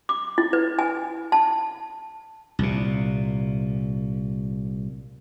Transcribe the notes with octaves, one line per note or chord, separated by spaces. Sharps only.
D6
E4
B4
G#5
A5
C2 A#2